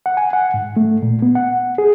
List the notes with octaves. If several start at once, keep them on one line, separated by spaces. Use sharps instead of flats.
F#5
G#5
F#5
G#2
A3
A#2
B3
F#5
G#4